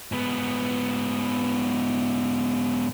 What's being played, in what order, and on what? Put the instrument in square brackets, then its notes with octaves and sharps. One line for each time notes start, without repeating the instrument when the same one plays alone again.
[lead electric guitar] G#2 B3